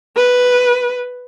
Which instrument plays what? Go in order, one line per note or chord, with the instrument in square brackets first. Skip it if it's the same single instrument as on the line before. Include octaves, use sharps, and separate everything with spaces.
[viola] B4